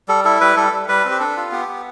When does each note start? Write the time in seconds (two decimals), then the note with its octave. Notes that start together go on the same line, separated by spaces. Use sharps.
0.08 G3 A4
0.24 E4 A4
0.41 G3 B4
0.57 G3 A4
0.72 G3
0.88 G3 B4
1.05 C4
1.11 G4
1.20 D4 A4
1.37 F4
1.52 B3 G4
1.68 B3